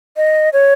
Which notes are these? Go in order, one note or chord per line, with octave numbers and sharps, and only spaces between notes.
D#5
C#5